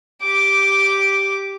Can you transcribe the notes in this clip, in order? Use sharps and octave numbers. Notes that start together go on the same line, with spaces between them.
G4 D6